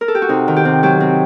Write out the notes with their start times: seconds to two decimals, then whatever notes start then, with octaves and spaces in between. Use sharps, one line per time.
0.01 A#4
0.08 A4
0.15 G4
0.22 F#4
0.29 C3 D#4
0.48 D#3
0.56 G4
0.65 C3
0.83 F#3 G4
1.00 C3